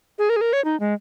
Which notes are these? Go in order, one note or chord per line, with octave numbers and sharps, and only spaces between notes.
G#4
A#4
G#4
A#4
C#5
D#4
G#3